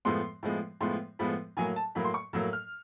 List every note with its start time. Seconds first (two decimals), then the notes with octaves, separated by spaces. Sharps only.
0.05 A2 F3 G#3 B3 C6
0.43 A2 F3 G#3 B3
0.81 A2 F3 G#3 B3 C6
1.19 A2 F3 G#3 B3 B5
1.57 A2 F#3 A#3 G#5
1.76 A5
1.95 A2 F#3 A#3 B5
2.04 C6
2.14 C#6
2.33 A2 F#3 A#3 E6
2.53 F6